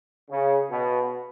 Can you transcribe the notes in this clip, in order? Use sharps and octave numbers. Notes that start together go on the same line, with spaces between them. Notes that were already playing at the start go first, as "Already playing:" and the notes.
C#3
B2